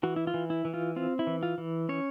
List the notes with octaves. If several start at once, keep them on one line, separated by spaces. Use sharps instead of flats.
E3 F#4
E4
F4
E3
E4
E3
F4
C4 F4
E4
E3
F4
E3
C#4 C#5